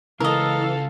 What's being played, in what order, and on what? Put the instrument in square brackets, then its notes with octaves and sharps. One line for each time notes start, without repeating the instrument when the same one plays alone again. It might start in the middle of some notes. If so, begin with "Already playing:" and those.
[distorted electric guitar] C#2 [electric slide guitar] E3 [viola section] A4 F5 [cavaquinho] A#4 D#5